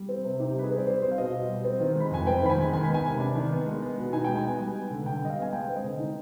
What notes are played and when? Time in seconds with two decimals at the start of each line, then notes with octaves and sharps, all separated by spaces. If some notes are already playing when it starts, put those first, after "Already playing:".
Already playing: G3
0.09 C4
0.24 C3
0.40 D#4 G4
0.56 G3 B4
0.64 G#4
0.71 C4
0.78 D5
0.87 G3 C5
1.02 C4 C5
1.11 F5
1.18 B2 D#5
1.33 B2
1.49 G3
1.64 C4
1.80 D#3
1.95 G#3
2.00 B5
2.11 F2 G#5
2.27 C4 G5
2.42 D#3 B5
2.50 G#5
2.58 G#3
2.73 D#3 G#5
2.84 B3 B5
2.94 G#5
3.05 C3
3.20 D4
3.35 D#3
3.51 B3
3.67 G#3
3.82 B3
3.98 B2
4.13 D#4 G#5
4.24 G#3 G5
4.36 G#5
4.45 B3
4.60 G3
4.75 B3
4.91 D3
5.06 D3 G5
5.22 G3 D#5
5.30 F5
5.37 B3 G#5
5.53 G#3 G5
5.68 C4
5.76 D#5
5.84 D3
5.99 D#4